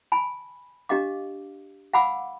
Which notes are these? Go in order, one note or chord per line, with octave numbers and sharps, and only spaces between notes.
G#5 A5 B5
D4 G4 D#5 F5 D6
F5 F#5 G#5 B5 D6 E6